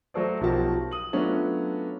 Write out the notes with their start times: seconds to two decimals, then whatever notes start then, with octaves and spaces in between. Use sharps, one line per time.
0.14 F#3 A3 F#4 A4 C5 D5
0.41 B1 F3 F#4 G4 A#4 A5
0.91 D#6 F#7
1.13 F#3 A3 B3 C#4 D4 F4